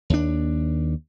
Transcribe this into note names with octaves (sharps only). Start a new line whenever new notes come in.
D#2 D4